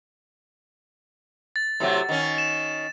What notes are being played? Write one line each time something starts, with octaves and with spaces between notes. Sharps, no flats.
A6
A2 C3 F#3
D#3 C#4
E7